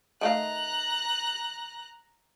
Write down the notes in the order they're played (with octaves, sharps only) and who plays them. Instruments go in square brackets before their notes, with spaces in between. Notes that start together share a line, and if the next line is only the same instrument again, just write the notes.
[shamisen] D#3 A3 F5 [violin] A#5 F#6